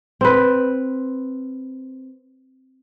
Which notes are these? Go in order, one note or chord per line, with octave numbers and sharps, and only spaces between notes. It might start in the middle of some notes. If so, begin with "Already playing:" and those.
C4 B4